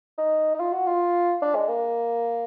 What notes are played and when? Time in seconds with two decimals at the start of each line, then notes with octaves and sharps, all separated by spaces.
0.18 D#4
0.54 D#4
0.60 F4
0.72 F#4
0.87 F4
1.42 D4
1.55 G#3
1.68 A#3